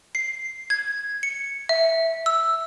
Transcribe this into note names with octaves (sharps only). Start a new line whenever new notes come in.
C7
G#6
C#7
E5
E6